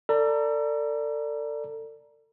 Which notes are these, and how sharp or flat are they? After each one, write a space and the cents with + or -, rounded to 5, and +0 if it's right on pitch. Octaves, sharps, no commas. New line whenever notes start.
A4 +35 D5 +0 A#5 +25